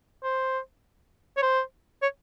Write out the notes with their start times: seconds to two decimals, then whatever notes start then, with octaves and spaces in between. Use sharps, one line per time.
0.23 C5
1.37 C#5
1.42 C5
2.02 C#5